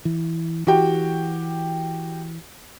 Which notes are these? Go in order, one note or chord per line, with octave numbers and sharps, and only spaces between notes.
E3
E3 F#4 G4 G5